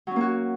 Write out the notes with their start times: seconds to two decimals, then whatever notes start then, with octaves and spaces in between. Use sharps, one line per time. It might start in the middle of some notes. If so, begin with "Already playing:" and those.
0.07 F#3
0.11 C#4
0.16 A#3
0.21 F#4